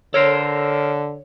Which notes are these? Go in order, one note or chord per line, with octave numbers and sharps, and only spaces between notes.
D3 A4 A#4 C5 C#5